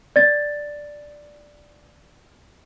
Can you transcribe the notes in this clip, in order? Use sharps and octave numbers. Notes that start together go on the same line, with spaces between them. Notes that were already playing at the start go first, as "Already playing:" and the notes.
D5 A6